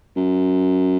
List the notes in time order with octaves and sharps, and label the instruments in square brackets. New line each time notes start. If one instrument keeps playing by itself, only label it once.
[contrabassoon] F#2